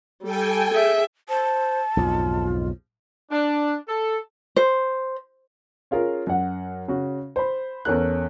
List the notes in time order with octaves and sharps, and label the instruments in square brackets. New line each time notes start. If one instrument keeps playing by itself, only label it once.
[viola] G3 [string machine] A4 G5 G#5
[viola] G#4 E5
[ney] C5 [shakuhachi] A5
[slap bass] B1 F2 G#2 [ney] F4
[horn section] D4
A4
[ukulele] C5
[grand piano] C#4 F4 G#4 A#4
F#2 F#5
C#3 F#4
C5 B5
E2 C#4 A4 A#4 F#6